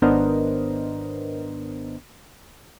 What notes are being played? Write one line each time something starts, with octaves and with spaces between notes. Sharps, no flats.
G#1 B3 D4 A#4 C5 D#5